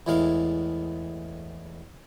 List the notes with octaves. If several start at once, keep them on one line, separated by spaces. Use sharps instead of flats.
E2 A2 E3 G#3 F5